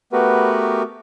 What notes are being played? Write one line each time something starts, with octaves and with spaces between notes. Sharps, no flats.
A3 B3 F#4 G4 A#4 B4